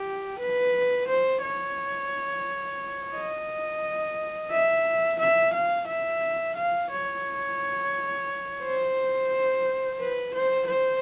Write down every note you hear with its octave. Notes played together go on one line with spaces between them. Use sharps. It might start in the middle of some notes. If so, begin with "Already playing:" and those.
Already playing: G4
B4
C5
C#5
D#5
E5
E5
F5
E5
F5
C#5
C5
B4
C5
C5